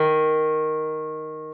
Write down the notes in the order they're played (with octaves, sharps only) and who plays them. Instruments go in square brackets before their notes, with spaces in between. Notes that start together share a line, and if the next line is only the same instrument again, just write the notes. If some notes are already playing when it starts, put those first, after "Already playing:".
Already playing: [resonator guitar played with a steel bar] D#3